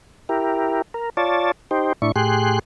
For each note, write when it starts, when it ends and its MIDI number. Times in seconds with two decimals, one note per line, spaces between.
0.29 0.82 64
0.29 0.82 67
0.29 0.82 70
0.94 1.10 70
1.17 1.52 65
1.17 1.52 73
1.17 1.52 74
1.17 1.52 81
1.71 1.93 63
1.71 1.93 67
1.71 1.93 72
2.02 2.12 45
2.02 2.12 62
2.02 2.12 64
2.02 2.12 85
2.16 2.59 45
2.16 2.59 67
2.16 2.59 68
2.16 2.59 84
2.16 2.59 90